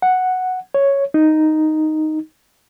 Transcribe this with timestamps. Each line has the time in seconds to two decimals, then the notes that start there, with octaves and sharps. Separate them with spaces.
0.02 F#5
0.74 C#5
1.14 D#4